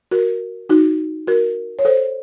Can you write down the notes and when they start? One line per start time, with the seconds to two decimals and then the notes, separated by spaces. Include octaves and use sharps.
0.11 F#4 A#4
0.69 D#4 F#4
1.27 F#4 A#4
1.79 C#5
1.85 A4 C5